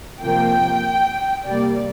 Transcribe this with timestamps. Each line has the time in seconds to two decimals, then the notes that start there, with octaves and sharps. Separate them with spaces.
0.21 C3 F3 A#3 G5
1.46 C3 G3 A#3 D5